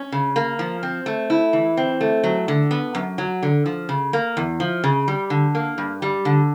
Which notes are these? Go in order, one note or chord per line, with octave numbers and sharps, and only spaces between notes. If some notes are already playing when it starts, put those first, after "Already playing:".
Already playing: C#4
C#3
A#3
F3
C4
A3
E4
E3
C4
A3
F#3
D3
B3
F#2
F#3
D3
F3
C#3
A#3
E2
F3
C#3
G3
D3
A#3
G2
G3
D3